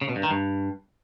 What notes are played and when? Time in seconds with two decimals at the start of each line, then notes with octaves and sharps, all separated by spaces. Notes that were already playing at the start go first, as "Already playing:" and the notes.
0.01 C#3
0.09 B2
0.16 G2
0.23 D#3
0.31 G2